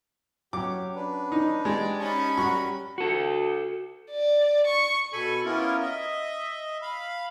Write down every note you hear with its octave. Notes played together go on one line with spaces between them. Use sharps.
F#3 C#4 G4 D6
D4 B4
D#4
G#3 G4 D5
C#4 D#4 A5 B5 C#6
G3 F#4 A#4 F#5 A#5 C#6
F#4 A4
D5
C#6
B2 A4 G#5 B5 C#6
A#3 B3 C#4 E4 F4 A#4
D#5 E5
F5 B5